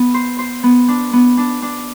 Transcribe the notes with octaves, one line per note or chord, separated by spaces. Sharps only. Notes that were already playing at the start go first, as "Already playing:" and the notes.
Already playing: B3
C5
C5
B3
D4
B3
D4
D4